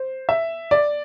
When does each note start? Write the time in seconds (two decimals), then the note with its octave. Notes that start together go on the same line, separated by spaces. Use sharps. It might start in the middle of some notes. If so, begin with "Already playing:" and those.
Already playing: C5
0.29 E5
0.71 D5